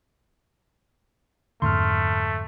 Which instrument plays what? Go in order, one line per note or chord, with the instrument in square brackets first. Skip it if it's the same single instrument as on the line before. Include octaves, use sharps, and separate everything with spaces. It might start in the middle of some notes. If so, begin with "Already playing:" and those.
[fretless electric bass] F2 G#2 D3 [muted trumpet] A3 [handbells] C6 F6